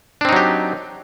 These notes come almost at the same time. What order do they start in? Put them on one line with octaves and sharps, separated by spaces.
D4 C4 D#4 F#3 G4